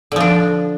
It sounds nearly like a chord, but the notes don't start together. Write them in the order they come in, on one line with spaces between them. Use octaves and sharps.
D3 F3 D4